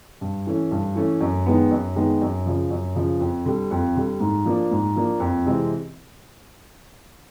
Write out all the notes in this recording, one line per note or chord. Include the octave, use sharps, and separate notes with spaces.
G2
E3 A3 C#4
G2
E3 A3 C#4
F#2
D#3 G#3 B3
F#2
D#3 G#3 B3
F#2
C#3 F3
F#2
C#3 F3
F2
D3 G3
F2
D3 G3
G#2
F3 A#3 D4
G#2
F3 A#3 D4
F2
C3 E3 G#3 C4